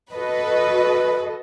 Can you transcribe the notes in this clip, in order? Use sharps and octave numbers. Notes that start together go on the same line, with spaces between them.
F#4 A4 B4 D#5